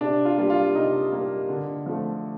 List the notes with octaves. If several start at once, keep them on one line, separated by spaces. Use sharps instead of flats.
C3 D4
F4
G3 A#3
F4
C3 D#4
G3 A#3
D3
F3 A3